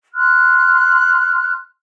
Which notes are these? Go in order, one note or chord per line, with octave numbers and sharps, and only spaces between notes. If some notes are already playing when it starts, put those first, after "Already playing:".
C6 F6 F#6